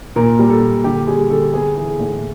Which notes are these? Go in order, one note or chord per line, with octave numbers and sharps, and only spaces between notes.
A#2 A#4
G3
A4
A#2
D3 G4
G3 G#4
D3 A4
B3 G#4
E3 G#4
A2